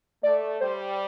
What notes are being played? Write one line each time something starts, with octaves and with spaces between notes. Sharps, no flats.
A3 D5
G3 C5